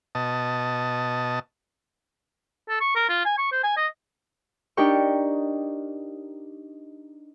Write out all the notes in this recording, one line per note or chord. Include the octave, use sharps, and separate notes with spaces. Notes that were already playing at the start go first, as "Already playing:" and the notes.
B2 D#5 A5
A4
C#6
A#4
F4
G#5
C#6
C5
G#5
D#5
D4 D#4 G4 A#4 G5 C#6